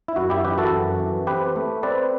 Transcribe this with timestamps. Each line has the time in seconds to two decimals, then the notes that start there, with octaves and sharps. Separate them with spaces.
0.08 E4
0.16 F#2 F#4
0.30 E4 G4
0.45 E3 G4 B4
0.58 F#4 A4
0.72 F#2
1.00 E3
1.27 C4 G4 B4
1.56 A3
1.83 C4 B4 D5